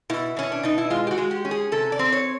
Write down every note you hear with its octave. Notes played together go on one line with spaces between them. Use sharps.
B2 E4
B2 C#4
D4
B2 D#4
E4
G#3 F4
G4
F#4
G#3
G4
C#4
G#4
C3 A4
D5
C4
C#5